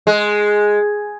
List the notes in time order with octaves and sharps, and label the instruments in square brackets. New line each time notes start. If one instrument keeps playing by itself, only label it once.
[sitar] G#3